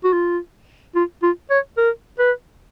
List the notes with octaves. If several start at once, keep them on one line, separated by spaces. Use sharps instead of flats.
F#4
F4
F4
F4
C#5
A#4
B4